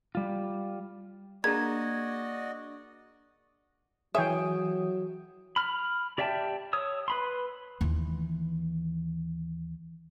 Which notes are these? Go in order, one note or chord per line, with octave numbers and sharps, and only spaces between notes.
G3 F4
A#3 D4 F#4 G#4 D5 D#5 A#5 G#6
E3 F#3 G#4 C#5 E5 G5 D#6
B5 F6
G4 D5 E5 G5 A5
C#5 D#6 E6
B4 B5 C6
D#2 E3